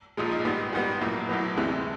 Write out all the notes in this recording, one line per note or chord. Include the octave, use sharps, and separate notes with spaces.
A#1 A#2 F3 G#3
D#4
G#2 D#3 G3 B3
G#2 D#3 G3 B3 F#4
A#1 A2 F#3 A#3
B1 A2 F#3 B3
D2 C3 E3 G#3